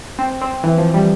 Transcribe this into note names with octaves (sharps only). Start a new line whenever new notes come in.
C4
C4
E3
F3
G3